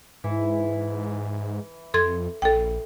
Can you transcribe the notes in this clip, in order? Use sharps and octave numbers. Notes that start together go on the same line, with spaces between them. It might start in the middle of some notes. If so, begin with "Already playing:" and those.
G#2 E3
F2 A4 C6 G#6
A#1 A4 G5